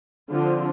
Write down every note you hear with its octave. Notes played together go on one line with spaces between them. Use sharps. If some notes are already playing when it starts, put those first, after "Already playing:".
D3 F3 C4 F4